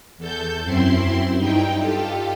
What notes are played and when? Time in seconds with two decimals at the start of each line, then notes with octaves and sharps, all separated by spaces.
0.18 E2 A4 G6
0.64 F#2 C4 E4 C6
1.37 G2 D#4 E4 G5
1.78 F4 G4 A4